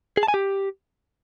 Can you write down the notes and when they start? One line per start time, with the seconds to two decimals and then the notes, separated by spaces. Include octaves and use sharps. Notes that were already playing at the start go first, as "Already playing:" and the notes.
0.17 G#4
0.23 A5
0.28 G#5
0.34 G4